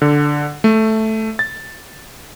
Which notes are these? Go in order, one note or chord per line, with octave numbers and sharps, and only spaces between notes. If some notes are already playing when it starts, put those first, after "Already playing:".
D3
A3
A6